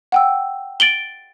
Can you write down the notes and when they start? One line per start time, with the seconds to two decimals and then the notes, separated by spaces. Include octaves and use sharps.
0.12 F#5 G5 E6
0.80 A6 D7 F#7 G7